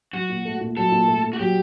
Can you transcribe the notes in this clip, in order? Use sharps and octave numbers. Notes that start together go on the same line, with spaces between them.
F#3 F#4
A#2
A3
A#2
F#3 A4
A#2
A3
A#2
F#4
F#3 G4